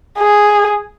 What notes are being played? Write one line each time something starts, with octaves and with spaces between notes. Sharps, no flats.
G#4